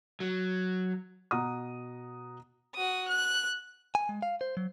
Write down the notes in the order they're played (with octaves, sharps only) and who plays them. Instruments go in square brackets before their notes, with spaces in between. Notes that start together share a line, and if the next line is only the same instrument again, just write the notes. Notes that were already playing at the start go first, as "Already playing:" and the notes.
[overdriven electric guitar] F#3
[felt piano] B2 F#5 A#5 D#6
[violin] F#4 D#6
F#6
[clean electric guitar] G#5
G#3
F5
C5
F#3